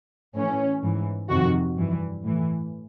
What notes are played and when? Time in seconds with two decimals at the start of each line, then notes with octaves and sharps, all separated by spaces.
0.36 A2 E3 C#4
0.83 G#2 E3
1.29 F2 C3 D#3 F#4
1.77 G2 E3
2.24 A2 E3